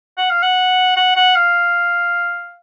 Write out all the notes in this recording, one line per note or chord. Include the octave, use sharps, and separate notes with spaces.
F#5
F5
F#5
F#5
F#5
F5